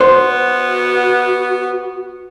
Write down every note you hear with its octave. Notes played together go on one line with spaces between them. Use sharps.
B3 F#4 C5